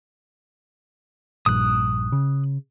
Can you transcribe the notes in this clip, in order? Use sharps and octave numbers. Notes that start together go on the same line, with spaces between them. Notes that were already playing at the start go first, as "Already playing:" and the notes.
A#1 G2 D#6 F#6
C#3